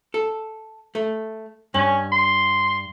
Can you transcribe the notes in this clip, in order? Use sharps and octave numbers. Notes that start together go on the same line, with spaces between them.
A4
A3
G2 C#4
C6